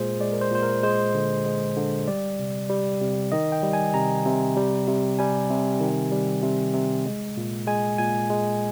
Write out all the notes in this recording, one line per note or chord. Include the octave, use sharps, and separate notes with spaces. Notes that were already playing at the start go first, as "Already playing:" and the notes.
Already playing: A#2 G#3 G#4 C5
G#3 D5
A#4
C5
A#2 C5
A#4
G#3 C5
D3
G#3
D3
G3 D5
C3
G3
C3
D#3 D#5
G5
G3
G#5
C3 A#5
C3
G3
C3
G3 G#5
C3
D#3
G3
C3
C3
G#3
A#2
G#3 G#5
A#2 G#5
G#3